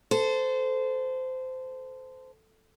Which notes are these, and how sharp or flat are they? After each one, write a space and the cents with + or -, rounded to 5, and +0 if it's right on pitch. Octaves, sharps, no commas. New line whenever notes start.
A4 +0 C5 -20